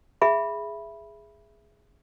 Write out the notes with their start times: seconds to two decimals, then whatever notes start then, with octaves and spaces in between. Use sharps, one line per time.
0.22 G#4 E5 B5